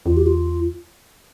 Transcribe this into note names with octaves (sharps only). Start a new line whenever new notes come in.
E2 F4
G4
F4